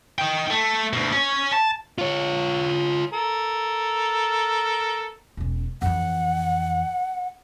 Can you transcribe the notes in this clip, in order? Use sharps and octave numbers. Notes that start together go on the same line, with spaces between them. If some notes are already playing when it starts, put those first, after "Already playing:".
D#4 G5
A3
D2 B2
C#4 C#5
A5
F4 C#5
A4 A#4
E1 C#4
F2 E3 F#5